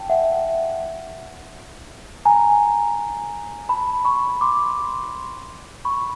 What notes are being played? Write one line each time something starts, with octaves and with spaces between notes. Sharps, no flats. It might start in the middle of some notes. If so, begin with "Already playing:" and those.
Already playing: G5 A5
E5 F#5
G#5 A#5
A5 B5
B5 C#6
C6 D6
B5 C#6